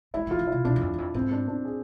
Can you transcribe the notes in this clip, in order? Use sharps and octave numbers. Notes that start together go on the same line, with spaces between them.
G#3 E4
F3
F4
D3
C3 E4
B2 D4
E2
F2
E2
F2
G#2 C4
D4
D4
G#4